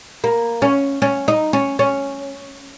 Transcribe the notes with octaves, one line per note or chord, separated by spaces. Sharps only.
A#3
C#4
C#4
D#4
C#4
C#4